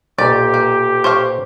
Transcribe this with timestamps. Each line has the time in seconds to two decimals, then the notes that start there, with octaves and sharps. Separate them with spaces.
0.18 B1 A#2 G4 B4 D5
0.54 A#3
1.04 C5 C#5 F5